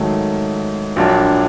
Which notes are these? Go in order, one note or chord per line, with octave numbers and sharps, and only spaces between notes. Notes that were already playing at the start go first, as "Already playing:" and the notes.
Already playing: G#2 D#3 F#3 A3
A#1 A#2 F#3 A#3 D4